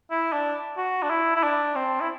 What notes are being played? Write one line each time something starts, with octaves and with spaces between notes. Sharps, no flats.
E4
D4
F#4
D4
E4
E4
D4
C4
E4